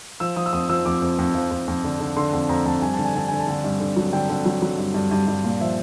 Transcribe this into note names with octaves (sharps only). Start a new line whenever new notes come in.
F3 E6
F3 D#6
E6
F2 D#6
F3 E6
F2 D6
F2
F2
F3
F2
F2
D3
D3
D3 C6
F2
F2 A#5
F2 A5
G2 G#5
D3 A5
G#5
D3 A5
D3 G#5
A5
D3 G#5
G2
D3
F#3
D3 G5
D3
F#3
F#3
G2
G2
G2
G2
A#2
F3 E5